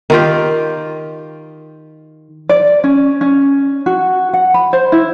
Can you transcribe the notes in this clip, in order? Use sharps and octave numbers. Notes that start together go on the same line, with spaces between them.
D#3 F4 G4
D5
C#4
C#4
F#4
F#5
B5
C5
E4